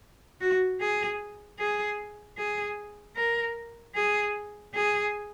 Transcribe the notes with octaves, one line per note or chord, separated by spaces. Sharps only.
F#4
G#4
G#4
G#4
A#4
G#4
G#4